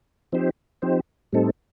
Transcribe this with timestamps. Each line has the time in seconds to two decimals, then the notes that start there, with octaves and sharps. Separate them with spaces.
0.32 F3 C4 D#4 G4 C5
0.82 F3 C4 D#4 G4 C5
1.33 A2 G3 C4 D#4 A4